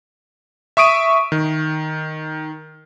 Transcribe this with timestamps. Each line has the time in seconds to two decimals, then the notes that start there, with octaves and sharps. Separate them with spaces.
0.77 E5 C#6 D#6 D7 D#7
1.32 D#3